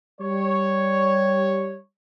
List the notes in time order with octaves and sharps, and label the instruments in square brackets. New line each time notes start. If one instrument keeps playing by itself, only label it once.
[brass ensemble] G3 C#5